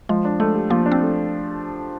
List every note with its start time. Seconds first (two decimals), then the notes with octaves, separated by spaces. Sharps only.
0.09 F3 G#3
0.25 D4
0.40 G#3 A3
0.55 G4
0.70 F3 A#3
0.86 D4
0.92 C4
1.01 A3